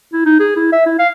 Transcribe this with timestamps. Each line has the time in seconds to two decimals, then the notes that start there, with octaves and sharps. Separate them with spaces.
0.13 E4
0.25 D#4
0.40 G#4
0.56 E4
0.73 E5
0.86 E4
0.99 F5